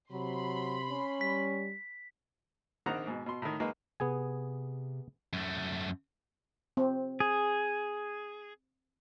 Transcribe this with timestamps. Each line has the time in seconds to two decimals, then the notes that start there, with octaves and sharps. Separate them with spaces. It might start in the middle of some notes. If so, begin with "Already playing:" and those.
0.12 C3 F#3 B5 C6
0.90 C#4
1.21 G3 B6
2.86 A#1 D#3 C4 D4 F#5 A#5
3.07 G#2 B2
3.26 B2 C6
3.42 A2 D#3
3.60 F#3 G#3 A#3 D#4 F#4 B4
4.00 C3 B3 G#4 G#5
5.33 F#2 A3
6.77 C4
7.20 G#4